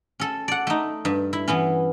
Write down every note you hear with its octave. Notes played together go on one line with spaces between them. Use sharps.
C#4 A4
D5 F#5
A3 D#4
G2
E4
E3 B3 C#4